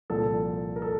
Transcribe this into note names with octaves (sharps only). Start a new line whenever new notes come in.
C2 A#2 F3 A4
A#4
A4